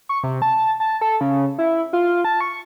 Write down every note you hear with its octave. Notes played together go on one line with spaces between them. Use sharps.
C#6
C3
A5
A5
A4
C#3
E4
F4
A5
C#6